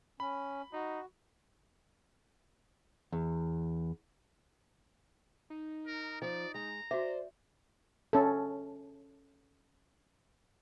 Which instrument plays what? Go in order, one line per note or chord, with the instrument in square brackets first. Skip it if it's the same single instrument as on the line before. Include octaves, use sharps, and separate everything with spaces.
[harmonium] C#4 [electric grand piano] B5
[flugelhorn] D#4 [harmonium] F#4
[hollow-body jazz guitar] E2
[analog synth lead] D#4
[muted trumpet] A#4
[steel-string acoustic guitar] F3 [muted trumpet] D5
[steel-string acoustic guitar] G#3 [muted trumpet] A#5
[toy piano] F#4 E5 [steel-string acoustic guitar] C5 [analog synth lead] D5
[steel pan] C#4 A4